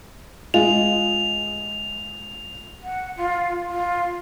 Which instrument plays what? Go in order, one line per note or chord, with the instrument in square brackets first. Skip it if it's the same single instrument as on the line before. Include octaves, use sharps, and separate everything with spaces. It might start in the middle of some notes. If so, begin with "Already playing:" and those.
[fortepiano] G#3 F4 [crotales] F7
[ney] F#5
F4
F4